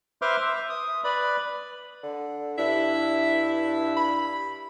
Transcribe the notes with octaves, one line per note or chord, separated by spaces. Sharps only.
B4 C5 E5 C6 D6 F6
E5
D#6
B4 D5 B5
D3
G2 D4 E4 E5
B5